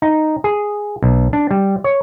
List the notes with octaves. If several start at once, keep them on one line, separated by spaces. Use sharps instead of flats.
D#4
G#4
B1
D4
G3
C#5